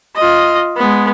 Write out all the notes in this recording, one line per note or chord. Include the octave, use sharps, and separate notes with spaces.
F4 D#5
G#3 B3